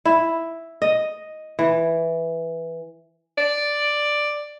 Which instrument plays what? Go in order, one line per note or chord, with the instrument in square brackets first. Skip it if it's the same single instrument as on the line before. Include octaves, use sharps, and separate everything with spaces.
[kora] E4
D#5
E3
[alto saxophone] D5